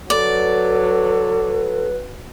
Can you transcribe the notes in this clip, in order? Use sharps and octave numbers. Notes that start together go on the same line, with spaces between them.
F#3 A4 B4 D5